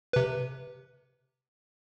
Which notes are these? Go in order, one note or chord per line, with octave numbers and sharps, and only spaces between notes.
C3 B4